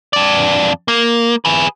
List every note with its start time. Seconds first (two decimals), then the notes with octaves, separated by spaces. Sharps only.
0.13 F2 D5
0.88 A#3
1.45 G#4 B4